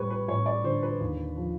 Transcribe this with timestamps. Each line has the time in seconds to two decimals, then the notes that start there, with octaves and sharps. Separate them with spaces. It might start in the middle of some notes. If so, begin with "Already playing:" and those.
Already playing: A1 G3 B4 C#5
0.10 B4
0.28 A1 C#5
0.46 D5
0.64 D3 C5
0.82 B4
1.00 D#2
1.36 F3